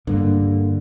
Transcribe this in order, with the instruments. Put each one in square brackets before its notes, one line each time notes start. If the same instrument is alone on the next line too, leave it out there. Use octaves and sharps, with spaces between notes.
[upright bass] G2 [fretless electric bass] D3 A#3